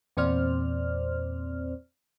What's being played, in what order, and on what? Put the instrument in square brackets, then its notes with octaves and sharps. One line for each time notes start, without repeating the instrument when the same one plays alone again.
[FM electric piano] E2 A#2 C4 C5 D5 F6